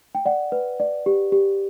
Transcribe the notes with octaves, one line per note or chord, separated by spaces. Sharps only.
G5
D5 F#5
B4
D5
G4
G4